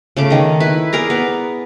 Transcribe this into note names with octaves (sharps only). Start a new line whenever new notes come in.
C#3 A3 D6
D#3 D#5
E4 B4
G#4 A#4 D5 A#5
B3